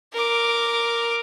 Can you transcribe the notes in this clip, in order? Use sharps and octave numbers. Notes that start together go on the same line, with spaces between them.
A#4 D6